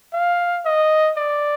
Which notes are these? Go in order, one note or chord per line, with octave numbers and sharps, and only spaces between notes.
F5
D#5
D5